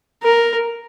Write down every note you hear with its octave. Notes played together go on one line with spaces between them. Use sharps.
A#4